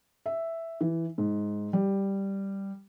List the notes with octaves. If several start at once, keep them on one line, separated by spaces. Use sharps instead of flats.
E5
E3
G#2
G3